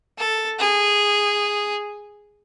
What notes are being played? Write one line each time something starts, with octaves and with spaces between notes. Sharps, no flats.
A4
G#4